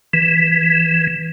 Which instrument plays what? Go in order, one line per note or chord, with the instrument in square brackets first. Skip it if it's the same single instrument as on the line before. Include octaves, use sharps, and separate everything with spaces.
[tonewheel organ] E3